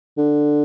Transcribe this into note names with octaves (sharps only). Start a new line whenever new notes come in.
D3